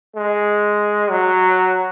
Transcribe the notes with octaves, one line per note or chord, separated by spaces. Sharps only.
G#3
F#3